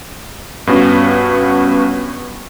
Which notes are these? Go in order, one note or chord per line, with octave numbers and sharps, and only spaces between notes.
G2 B3 C#4 F#4